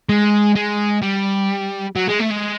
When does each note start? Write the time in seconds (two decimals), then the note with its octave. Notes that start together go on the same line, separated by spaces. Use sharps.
0.09 G#3
0.56 G#3
1.02 G3
1.96 F#3
2.08 G#3
2.19 A3
2.30 G#3